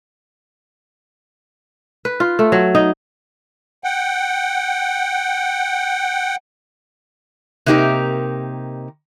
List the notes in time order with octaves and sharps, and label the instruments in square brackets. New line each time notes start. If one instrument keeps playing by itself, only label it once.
[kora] B4
F4
A3
F#3
D#4
[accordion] F#5 G5
[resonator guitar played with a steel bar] C3 A#3 D#4 G4 A#4